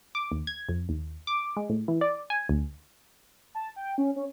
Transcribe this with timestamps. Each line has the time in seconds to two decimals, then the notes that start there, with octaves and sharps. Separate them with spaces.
0.15 D6
0.32 D#2
0.47 G#6
0.69 F2
0.89 D#2
1.27 D6
1.57 G#3
1.70 A2
1.88 E3
2.01 D5
2.30 G#5
2.49 D2
3.55 A5
3.76 G5
3.98 C#4
4.16 C#4